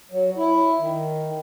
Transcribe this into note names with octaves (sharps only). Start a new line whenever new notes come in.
F#3
E4
D#3